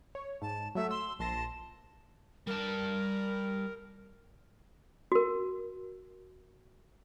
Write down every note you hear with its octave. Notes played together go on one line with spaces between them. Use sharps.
C#5
G#2 A5
F#3 A3 E5
C6 E6
A#1 A5 C6 A#6
G3 A#4 A5
F#4 A#4